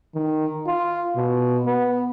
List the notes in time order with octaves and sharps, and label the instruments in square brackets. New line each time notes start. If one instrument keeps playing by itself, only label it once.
[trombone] D#3
F4
B2
B3